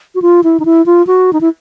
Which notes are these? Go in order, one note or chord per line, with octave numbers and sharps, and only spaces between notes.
F#4
F4
E4
D#4
E4
F4
F#4
D#4
E4